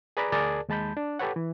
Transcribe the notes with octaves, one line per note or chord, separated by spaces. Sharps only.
G#4 B4 D5 A#5 B5
D2 G#4 A#4 D5 A5
D#2 G#3 A5 B5 G6
D4
G4 A4 B4 C#5 F#5
E3